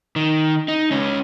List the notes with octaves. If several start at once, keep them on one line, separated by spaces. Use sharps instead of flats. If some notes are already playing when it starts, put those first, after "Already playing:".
D#3
D#4
C#2 C#4